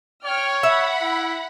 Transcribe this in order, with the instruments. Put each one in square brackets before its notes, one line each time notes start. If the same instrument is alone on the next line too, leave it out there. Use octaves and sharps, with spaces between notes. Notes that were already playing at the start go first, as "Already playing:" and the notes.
[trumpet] C#5 [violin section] G5 F6
[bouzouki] E5 [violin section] F#5 B5
[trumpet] E4